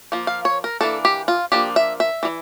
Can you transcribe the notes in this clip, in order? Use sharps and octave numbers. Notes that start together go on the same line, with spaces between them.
F3 A#3
F5
C#5
A#4
E3 A#3 D4 A4
G4
F4
F3 A#3 D4 G4
E5
E5
E3 G3